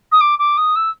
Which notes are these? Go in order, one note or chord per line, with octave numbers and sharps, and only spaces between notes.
D#6
D6
D6
D#6
E6